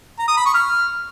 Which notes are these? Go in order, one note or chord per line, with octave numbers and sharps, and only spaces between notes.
A#5
D#6
B5
C#6
F6